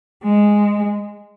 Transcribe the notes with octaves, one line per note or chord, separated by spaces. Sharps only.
G#3